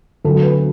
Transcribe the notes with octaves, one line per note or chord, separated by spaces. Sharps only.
D2 D3 F#3 A4
B4